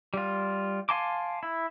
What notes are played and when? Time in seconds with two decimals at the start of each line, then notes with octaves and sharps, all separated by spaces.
0.14 G3 F4
0.89 F5 G#5 A5 C6 D6
1.43 E4